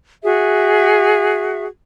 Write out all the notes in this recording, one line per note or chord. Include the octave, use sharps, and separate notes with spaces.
F#4 G#4 E5